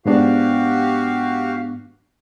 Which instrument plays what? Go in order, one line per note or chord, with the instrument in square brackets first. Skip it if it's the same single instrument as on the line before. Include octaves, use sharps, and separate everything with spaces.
[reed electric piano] G#2 B3 D4 [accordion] F#4 G4 F5